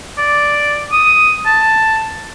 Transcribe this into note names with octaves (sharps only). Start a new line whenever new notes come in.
D5
D#6
A5